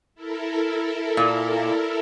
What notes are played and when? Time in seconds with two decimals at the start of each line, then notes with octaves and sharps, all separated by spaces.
0.15 E4 A4 A#4
1.17 A#2